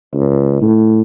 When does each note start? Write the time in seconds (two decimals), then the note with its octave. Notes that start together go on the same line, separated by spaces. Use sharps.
0.14 C#2
0.61 A2